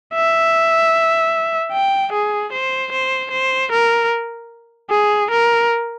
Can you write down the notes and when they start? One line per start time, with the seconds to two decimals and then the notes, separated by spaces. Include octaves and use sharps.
0.15 E5
1.72 G5
2.12 G#4
2.52 C5
2.92 C5
3.31 C5
3.72 A#4
4.90 G#4
5.31 A#4